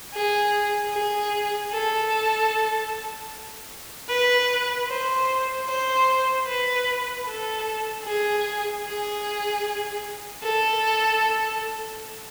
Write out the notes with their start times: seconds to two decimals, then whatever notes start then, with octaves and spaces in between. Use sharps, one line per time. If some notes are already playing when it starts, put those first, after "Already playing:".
0.14 G#4
0.93 G#4
1.72 A4
4.09 B4
4.88 C5
5.68 C5
6.47 B4
7.26 A4
8.05 G#4
8.85 G#4
10.43 A4